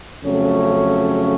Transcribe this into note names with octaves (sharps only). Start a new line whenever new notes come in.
F2 C#3 F#3 A3 C#4